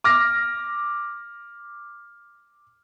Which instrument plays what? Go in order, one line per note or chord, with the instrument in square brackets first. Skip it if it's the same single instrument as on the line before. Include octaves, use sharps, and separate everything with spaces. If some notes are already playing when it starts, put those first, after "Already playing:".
[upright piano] D6 F6 A#6